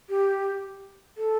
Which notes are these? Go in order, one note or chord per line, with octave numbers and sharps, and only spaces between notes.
G4
A4